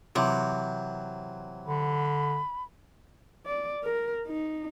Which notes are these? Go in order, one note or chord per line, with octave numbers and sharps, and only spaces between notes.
C3 E3 F#3
D3 B5
D5
A#4
D#4